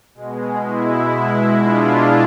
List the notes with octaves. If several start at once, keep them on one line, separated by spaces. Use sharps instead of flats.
B2 G#3
E4
B2 G#3
D4 F4